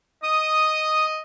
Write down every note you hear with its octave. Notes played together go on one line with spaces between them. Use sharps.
D#5 D#6